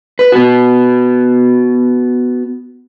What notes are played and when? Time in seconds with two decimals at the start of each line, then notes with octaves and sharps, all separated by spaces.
0.19 B4
0.32 B3 F#4